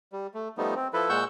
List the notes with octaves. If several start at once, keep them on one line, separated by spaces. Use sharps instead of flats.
G3
A3
F3 G3 A3 B3 D#4
C4
F3 E4 A4 B4
A#2 G#3 F#5 C#6 E6 G6